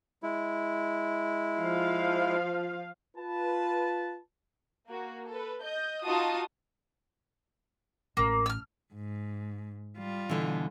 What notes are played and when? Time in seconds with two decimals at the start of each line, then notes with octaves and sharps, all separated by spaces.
0.23 G#3 E4
1.58 F3 F4 F5
3.17 F4 B4 A5
4.89 A#3 F#4
5.29 A4 B4
5.63 D#5 G6
6.05 D#4 F4 F#4 A5 D#6
8.17 A1 A#3
8.46 E6 F6
8.93 G#2
9.98 G3 F4
10.29 B2 D3 E3